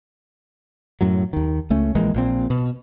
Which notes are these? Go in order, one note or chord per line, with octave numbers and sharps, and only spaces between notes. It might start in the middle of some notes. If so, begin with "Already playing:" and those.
F#2 A2 F#3
D#2 D#3
C#2 A3 C#4
A#1 E3 G#3 A#3
A#1 A#2 C4
B2